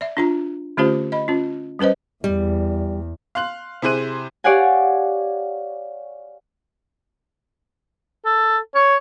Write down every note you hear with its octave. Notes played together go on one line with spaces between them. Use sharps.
D5 E5
D4 F4 A#5
D3 A3 C#4 F4 G4 C5
D#5 B5
C#4 F4
G3 C#4 B4 C5 D#5
E2 G3
F5 C6 F#6 F#7
C3 E4 G#4 C5 F#6 D#7
G4 C#5 D5 F5 F#5 G#5
A4
C#5